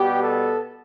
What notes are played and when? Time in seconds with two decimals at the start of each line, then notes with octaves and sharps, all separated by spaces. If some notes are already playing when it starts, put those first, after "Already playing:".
Already playing: B2 G3 B3 G4
0.23 A4